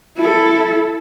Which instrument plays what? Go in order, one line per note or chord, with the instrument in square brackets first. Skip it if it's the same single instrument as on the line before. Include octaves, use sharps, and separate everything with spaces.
[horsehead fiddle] E4 A4